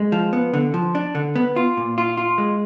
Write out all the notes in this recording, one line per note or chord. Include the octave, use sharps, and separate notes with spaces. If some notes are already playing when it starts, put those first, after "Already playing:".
Already playing: G#3
F3
B3
D3
F3
D4
D3
B3
F4
A#2
F4
F4
G#3